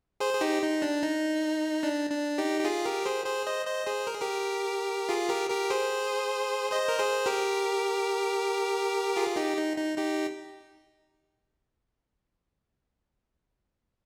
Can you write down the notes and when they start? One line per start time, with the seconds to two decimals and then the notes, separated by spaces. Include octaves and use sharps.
0.20 G#4 C5
0.34 G#4
0.41 D#4 G4
0.62 D#4
0.82 D4
1.03 D#4
1.83 D4
2.10 D4
2.38 D#4 G4
2.61 G4
2.65 F4 G#4
2.85 G4 A#4
3.05 G#4 C5
3.26 G#4 C5
3.47 C5 D#5
3.67 C5 D#5
3.87 G#4 C5
4.07 A#4
4.14 G#4
4.22 G4 A#4
5.09 F4 G#4
5.29 G4 A#4
5.50 G4 A#4
5.70 G#4 C5
6.72 C5 D#5
6.88 A#4
6.99 G#4 C5
7.26 G4 A#4
9.16 F4 G#4
9.36 D#4 G4
9.57 D#4
9.77 D#4
9.98 D#4 G4